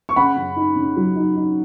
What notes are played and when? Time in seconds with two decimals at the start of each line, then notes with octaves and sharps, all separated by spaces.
0.09 C#6
0.16 C#3 F#5 B5
0.37 F#2
0.56 D#4
0.76 C#3
0.96 F#3
1.16 D#4
1.36 D#4